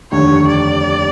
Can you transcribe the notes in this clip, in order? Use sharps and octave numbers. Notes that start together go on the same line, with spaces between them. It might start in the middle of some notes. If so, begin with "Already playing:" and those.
F1 D#2 D3 C#5
D5